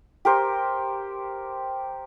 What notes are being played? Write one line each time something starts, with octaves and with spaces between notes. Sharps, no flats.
G4 A#4 C5